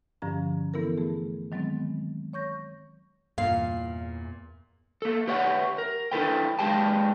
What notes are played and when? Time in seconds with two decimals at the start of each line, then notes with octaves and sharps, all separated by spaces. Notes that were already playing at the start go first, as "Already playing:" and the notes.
0.22 G2 D3 F3 C#4 A#5
0.74 E3 B3 E4 A4 A#4
0.98 A3 G#4
1.52 D#3 F#3 G#3 B3 C4
2.33 C#5 C#6 G6 A#6
3.38 E2 G2 A#2 F5
5.02 A#3 A4
5.27 G4 B4 C#5 E5 F#5
5.78 A#4
6.12 D4 E4 F#4 A4 B4 G5
6.59 G#3 G4 G#4 B4 G5 A5